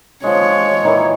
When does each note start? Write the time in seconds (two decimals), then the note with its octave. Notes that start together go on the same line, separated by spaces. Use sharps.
0.24 F3 G#3 C#5
0.83 A#2 D#3 E3